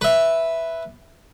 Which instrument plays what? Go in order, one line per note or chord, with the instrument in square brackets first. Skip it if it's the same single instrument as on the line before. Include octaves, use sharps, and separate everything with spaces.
[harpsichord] B4 E5